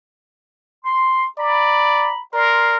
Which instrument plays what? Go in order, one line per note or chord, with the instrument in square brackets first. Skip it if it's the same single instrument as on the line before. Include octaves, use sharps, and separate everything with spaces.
[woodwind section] C6
[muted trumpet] D5 [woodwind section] A#5 B5
[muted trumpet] A#4 [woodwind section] D5 C6